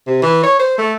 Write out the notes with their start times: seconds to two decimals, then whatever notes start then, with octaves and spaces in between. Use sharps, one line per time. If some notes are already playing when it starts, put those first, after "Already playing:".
0.07 C3
0.22 E3
0.43 C#5
0.60 C5
0.78 A3